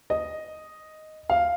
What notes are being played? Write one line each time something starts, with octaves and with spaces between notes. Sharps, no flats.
D#5
F5